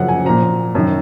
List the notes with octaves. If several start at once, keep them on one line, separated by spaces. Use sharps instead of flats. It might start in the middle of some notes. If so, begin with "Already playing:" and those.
Already playing: F#2 C#3 F3 F#5
G#5
A#2 F3 A#5
F#2 D#3